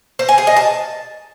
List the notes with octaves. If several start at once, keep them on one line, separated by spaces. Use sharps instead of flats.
C5
G#5
G#4
D#5
A5